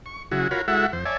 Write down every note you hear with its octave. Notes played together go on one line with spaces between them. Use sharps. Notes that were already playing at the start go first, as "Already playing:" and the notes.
C#6
C#3 F#3 E4 F#4 G#4
F4 F#4 A#4 C#5 B5
G#3 E4 F#4 A4 E5 F#5
F2 C5
C#5 D5 E5 G#5 A5